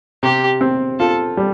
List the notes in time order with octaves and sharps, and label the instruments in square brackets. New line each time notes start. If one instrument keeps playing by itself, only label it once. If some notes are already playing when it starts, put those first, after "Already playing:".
[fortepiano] C3 [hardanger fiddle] G4
[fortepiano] C4
[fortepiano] F4 [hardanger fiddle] A4
[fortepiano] G3